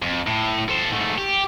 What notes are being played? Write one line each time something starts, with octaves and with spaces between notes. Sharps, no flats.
F2
A2
A4 C5
G#2 A3
G4